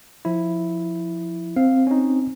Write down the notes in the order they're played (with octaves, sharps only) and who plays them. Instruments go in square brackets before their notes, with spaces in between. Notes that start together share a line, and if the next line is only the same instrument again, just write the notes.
[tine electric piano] F3 E4
[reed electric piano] C4 [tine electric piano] F5
[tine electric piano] C#4 D#4